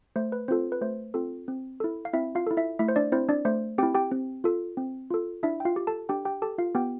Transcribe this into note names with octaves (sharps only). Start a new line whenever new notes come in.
A3 C5
B4
C4 F4 A4 C5
B4
A3 C5
C4 F4 A4
C4
E4 A4
F5
C4 E4 E5
F4 F5
E4 A4
E4 E5
A3 E4 E5
C5
D4 D5
C4 E4 C5
D4 D5
A3 C5
C4 E4 G4 G5
G4 G5
C4
F4 A4
C4
F4 A4
D4 E4 E5
G5
F4 F5
G4
A4 A5
D4 G4 G5
G4 G5
G4 A4 A5
F4 F5
B3 G4 G5